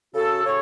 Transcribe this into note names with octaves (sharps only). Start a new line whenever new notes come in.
C#3 F#4 A4
C#3 A4 C#5